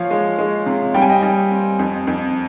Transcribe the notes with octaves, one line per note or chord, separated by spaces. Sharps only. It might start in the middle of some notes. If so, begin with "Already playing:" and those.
Already playing: F3 C#5 F5
G#3
G#3
C3
G3 G5
G#5
D#5 G5
G3
C4
F2
F2